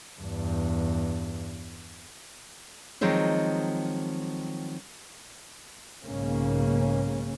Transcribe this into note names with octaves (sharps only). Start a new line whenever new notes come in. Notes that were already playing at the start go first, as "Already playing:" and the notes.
E2 G2
D#3 F3 F#3 G#3 C4 D#4
B1 G#2 C#3 A#3 C#4